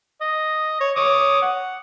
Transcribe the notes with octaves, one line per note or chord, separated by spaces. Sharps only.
D#5
C#5
C#5 D6 D#6
F#5